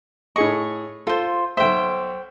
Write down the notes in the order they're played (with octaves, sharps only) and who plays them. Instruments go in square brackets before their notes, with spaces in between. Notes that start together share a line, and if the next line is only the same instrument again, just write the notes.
[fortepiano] A2 G#4 D#5 [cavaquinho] C#6
[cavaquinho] F4 C5 [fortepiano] A4
[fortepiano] B1 E5 [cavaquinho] C5 G5